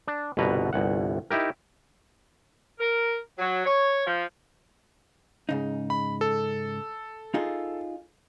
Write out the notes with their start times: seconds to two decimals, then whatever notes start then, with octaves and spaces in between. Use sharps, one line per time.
0.07 D4
0.37 G1 C2 B2 B4 F#5 A#5
0.73 G1 C2 F#5
1.30 D#4 E4 G4 A#4
2.79 A#4
3.38 F#3
3.66 C#5
4.06 F3
5.49 G#2 C#3 D#4
5.90 B5
6.21 A4
7.34 D#4 F4 G#4